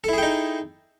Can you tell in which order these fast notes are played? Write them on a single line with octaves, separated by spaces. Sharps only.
A4 E4 G#4 G5 D#4